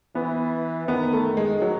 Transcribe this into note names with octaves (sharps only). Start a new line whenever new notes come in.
E3 B3
D#3 B3
A3
G#3
F#3